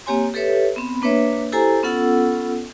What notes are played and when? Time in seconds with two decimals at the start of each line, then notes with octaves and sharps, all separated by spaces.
0.06 A#3 C4 G4 C#5 G#5 C6
0.34 G4 A4 B4 C#5 E5
0.76 B3 C4 B5
1.02 A#3 D4 B4 C#5 E5
1.52 E4 G4 A4 C5 G#5 A#5
1.83 B3 C#4 F4 A4 F#5 E6